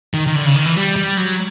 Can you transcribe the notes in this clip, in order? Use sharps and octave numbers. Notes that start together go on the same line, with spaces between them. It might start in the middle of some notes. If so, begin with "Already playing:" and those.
D#3
D#3
D3
C#3
D#3
E3
G3
G3
F#3